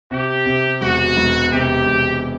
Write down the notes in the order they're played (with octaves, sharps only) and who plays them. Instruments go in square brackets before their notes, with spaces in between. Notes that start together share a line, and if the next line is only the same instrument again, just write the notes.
[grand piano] C3 [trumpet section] G4
[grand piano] C3
[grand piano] E1 [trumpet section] F#4
[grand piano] E1
[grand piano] C3 [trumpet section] G4
[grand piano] E1